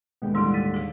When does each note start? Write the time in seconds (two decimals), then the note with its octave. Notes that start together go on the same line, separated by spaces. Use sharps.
0.22 D#2 B2 D3 G#3 B3 G5
0.35 D#2 A2 D3 G3 D4 E4 C6 E6
0.54 A6 B6 D#7
0.74 G#4 F5